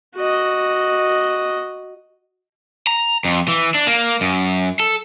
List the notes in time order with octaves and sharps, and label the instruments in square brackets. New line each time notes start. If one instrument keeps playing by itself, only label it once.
[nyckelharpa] F#4 D#5
[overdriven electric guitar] A#5
F2
E3
D4
A#3
F#2
A4